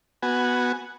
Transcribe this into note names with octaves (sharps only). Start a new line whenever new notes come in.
B3 F#4 G#5